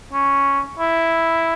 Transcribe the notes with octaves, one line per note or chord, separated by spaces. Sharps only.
C#4
E4